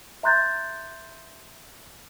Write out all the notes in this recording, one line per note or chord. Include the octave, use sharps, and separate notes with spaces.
E5 A#5 C6 F#6 G6 A6